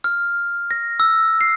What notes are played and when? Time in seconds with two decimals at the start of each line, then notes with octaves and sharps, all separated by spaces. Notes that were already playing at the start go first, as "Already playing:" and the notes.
0.04 F6
0.71 A#6
1.00 E6
1.41 C7